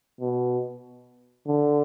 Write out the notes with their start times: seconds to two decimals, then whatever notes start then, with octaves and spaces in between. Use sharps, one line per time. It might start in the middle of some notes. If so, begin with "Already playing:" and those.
0.21 B2
1.47 D3